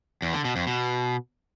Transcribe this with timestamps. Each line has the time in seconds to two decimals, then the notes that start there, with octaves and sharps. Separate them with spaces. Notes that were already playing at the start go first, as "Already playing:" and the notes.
0.22 E2
0.33 D3
0.45 B2
0.56 F2
0.67 B2